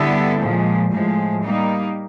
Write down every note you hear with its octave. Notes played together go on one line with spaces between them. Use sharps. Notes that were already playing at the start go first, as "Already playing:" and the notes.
Already playing: D3 G3 B3 E4 A4
A#2 F3 G#3
A2 F3 G#3
G3 A#3 D#4